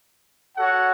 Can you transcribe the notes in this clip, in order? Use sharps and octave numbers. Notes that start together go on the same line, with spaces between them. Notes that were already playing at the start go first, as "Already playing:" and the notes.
F#4 A4 C#5 F#5